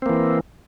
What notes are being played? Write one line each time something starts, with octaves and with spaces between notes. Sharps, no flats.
E3 A#3 C4